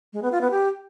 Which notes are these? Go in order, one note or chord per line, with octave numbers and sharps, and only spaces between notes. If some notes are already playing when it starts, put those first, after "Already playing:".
G#3
B3
F4
B3
G4